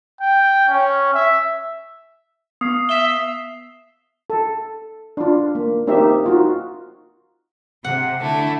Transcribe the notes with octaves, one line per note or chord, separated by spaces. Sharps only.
G5
C#4
E5
B3 D#6 C7
E5 B6 E7 G7
A4
D4 F4
A#3
A#3 C4 D#4 G4 E5
D#4 F4 F#4
C3 F#5
D3 A3 E4